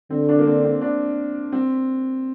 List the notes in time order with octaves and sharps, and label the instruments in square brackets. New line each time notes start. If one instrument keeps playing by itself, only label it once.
[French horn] D3 [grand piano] C4
[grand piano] D4
A#3
C4
C4
D4
C4